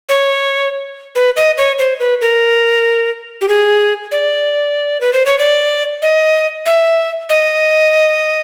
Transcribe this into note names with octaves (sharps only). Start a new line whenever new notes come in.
C#5
B4
D#5
C#5
C5
B4
A#4
G4
G#4
D5
B4
C5
C#5
D5
D#5
E5
D#5